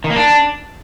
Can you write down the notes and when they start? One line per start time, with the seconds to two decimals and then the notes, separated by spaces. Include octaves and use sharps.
0.04 D#3
0.10 A#3
0.16 D4